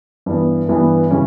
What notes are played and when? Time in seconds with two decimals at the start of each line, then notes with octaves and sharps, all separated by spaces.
0.26 G2 E3 B3
0.69 G2 E3 B3
1.11 C#3 E3 G3 C#4